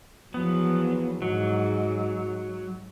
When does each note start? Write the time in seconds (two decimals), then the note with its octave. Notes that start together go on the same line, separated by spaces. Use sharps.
0.34 E2 F3 F#3 B3
1.22 G#2 F#3